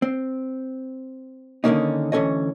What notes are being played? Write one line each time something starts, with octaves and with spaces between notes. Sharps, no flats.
C4
D3 D#3 A3 A#3 C#4 D#4
D2 E3 C#4 A4 C#5 D#5